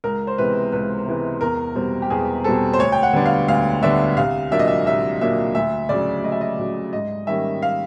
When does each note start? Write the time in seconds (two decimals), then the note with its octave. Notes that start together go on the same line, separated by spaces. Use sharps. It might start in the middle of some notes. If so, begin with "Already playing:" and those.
0.04 C#2 A#4
0.27 C5
0.38 C3 E3 G#3 B3 B4
0.72 C#2 B4
1.06 C3 E3 G#3 B3
1.41 E2 A#4
1.75 B2 G3 C4
2.02 G4
2.10 E2 G#4
2.44 B2 G3 C4 A4
2.73 C5
2.79 D2 C#5
2.92 G5
3.03 F#5
3.13 D3 G3 B3 D4
3.26 F5
3.48 D2 F5
3.82 D3 G3 B3 D4 E5
4.17 C2 F5
4.51 A#2 F#3 A#3 D4 E5
4.59 D#5
4.68 E5
4.86 C2 E5
5.21 A#2 F#3 A#3 D4 E5
5.55 D2 E5
5.89 C#3 F#3 D5
6.24 D2 D#5
6.32 E5
6.41 D#5
6.59 C#3 F#3
6.93 G#2 D#5
7.27 D#3 G3 A#3 C#4 E5
7.62 F5